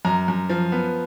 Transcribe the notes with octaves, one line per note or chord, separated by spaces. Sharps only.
F#2 A#5
F#2
F3
B3